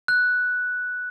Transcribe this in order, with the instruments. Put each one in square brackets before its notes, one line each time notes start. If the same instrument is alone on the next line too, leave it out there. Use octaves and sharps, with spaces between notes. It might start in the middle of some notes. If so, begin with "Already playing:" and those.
[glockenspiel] F#6